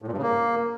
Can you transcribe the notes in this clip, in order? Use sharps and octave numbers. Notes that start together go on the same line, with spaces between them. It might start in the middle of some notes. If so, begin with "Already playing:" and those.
A2
A#2
G2
C#3
A#3